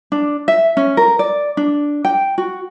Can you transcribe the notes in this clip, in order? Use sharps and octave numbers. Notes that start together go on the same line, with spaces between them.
D4
E5
C#4
A#4
D5
D4
G5
F#4